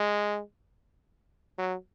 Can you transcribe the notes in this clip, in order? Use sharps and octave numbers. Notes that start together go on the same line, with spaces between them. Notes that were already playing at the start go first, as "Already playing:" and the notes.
Already playing: G#3
F#3